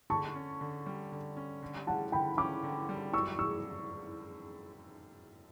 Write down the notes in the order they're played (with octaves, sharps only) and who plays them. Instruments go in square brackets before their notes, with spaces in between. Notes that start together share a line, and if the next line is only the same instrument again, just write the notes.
[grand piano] D3 [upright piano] A5 C#6
[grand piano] C#4
D3
G3
D3
C#4
D3
[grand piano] G3 [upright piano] F#5 A5
[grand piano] D3 [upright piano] G5 B5
[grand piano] C#4 [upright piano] B5 D6
[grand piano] D3
G3
[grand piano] F#2 [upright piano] C#6 E6
[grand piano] F#3 [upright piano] C#6 E6